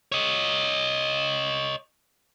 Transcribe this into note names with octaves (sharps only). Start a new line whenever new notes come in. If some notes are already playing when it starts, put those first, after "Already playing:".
C#5 D#5